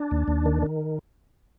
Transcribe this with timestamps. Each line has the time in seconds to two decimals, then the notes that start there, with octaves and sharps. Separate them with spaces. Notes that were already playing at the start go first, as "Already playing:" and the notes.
Already playing: D4
0.11 D#2
0.28 D#2
0.46 D#3
0.63 D#3